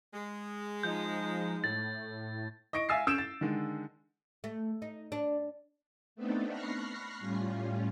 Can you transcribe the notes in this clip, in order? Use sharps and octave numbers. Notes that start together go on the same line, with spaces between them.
G#3
F3 D#4 G6
A2 A6
D#5 C#6 A#6 D7
E5 F5 G#5 E6 A6 C7
C#4 E6 G6 D7 E7
A6
D3 D#3 G#3
A3
D#4
D4
A3 B3 C4 D4 D#4 A4
B5 C#6 F6 F#6 A#6 C7
A2 G3 C#4 F4